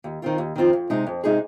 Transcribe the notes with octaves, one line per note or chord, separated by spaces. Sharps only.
D#2
D#3 C4 F4
D#2
D#3 C4 F4
F2
C3 G#3 D#4 G#4
F2
C3 G#3 D#4 G#4